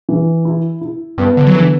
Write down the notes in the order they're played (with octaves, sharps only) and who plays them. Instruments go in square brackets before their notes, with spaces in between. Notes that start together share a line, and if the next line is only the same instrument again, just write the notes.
[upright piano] E3
E4
E4
[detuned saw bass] G2 [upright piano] B3
[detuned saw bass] D3
F#3
[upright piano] D3 [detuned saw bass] E3